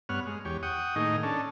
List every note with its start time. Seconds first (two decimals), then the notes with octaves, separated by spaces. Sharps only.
0.09 G2 B3 C#5 F#5 F6
0.27 G#3
0.45 E2 G4 C#5
0.63 F#5 G5 C#6 D#6
0.96 A2 D#3 A#3 D#4 G#4 D#5
1.23 C#4 D4 A4